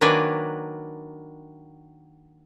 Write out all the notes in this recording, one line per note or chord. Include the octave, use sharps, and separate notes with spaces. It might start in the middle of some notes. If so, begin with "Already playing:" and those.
D#3 F#3 A#3 D4 B4 G#5